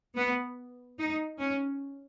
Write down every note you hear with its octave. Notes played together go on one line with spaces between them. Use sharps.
B3
D#4
C#4